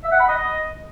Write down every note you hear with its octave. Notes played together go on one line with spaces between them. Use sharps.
E5
F#5
B5
D#5